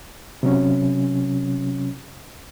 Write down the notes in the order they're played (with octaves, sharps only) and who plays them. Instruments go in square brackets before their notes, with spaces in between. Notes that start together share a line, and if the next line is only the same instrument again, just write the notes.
[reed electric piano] C3 F#3 C#4